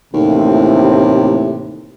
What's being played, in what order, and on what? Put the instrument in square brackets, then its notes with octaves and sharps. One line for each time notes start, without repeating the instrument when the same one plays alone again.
[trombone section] A1 A2 C3 [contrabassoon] D#2